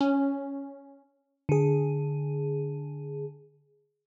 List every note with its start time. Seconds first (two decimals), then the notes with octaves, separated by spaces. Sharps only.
0.01 C#4
1.49 D3 G#4